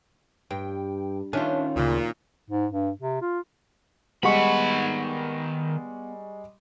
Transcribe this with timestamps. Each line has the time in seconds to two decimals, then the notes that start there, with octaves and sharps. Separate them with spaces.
0.51 G2 G5
1.33 D#3 C#4 D4 F4 E5
1.76 D2 A#2 C#3
2.50 G#2
2.72 G2
3.01 C3
3.22 F4
4.23 D#3 G3 G#3 B3 F#5 B5 C#6